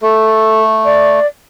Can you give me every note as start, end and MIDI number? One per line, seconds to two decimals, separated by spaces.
0.02 1.20 57
0.02 0.62 69
0.85 1.27 74